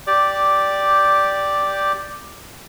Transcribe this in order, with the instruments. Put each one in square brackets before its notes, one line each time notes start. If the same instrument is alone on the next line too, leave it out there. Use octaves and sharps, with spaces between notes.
[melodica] G4 D5 D6